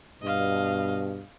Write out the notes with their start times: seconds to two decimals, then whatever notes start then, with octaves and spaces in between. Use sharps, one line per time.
0.22 G2 B2 D#5 F5